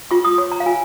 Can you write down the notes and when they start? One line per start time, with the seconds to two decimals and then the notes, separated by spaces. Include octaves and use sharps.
0.11 F4 C#6
0.25 D#6
0.38 C#5 C#6
0.52 A#5
0.60 F5
0.66 F4 G#5